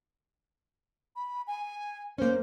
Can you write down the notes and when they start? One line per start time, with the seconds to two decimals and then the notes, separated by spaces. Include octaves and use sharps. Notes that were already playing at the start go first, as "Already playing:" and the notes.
1.16 B5
1.47 G#5
2.18 A#3 C#4 C5